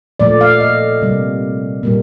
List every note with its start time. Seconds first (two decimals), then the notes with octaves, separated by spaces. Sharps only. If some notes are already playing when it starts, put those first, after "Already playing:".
0.20 A#2 F3 A3 D5
0.41 F5
0.60 D#5
1.02 C3 G3 A#3
1.83 A#2 G3 A#3